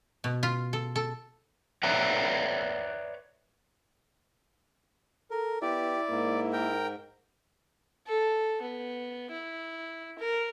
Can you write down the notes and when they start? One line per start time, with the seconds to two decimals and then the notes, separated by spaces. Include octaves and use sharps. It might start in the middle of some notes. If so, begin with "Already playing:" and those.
0.24 B2
0.43 F4
0.73 A4
0.96 A4
1.83 B4 C#5 D5 E5 F#5 A#5
5.31 A4 A#4
5.62 B3 E4 G4 D5
6.10 G#2 A#3
6.53 A#4 G5
8.07 A4
8.62 B3
9.31 E4
10.19 A#4